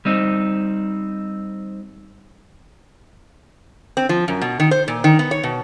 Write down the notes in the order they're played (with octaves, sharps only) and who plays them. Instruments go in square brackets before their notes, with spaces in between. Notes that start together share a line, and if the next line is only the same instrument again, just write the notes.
[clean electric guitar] G3 C4 D#4
[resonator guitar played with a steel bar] C4
F3
F#2
B2
D#3
C5
A#2
D#3
B3
C#5
B2